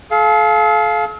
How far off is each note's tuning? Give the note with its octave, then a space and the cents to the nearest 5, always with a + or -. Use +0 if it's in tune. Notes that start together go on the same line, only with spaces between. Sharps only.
A4 -40 F5 +0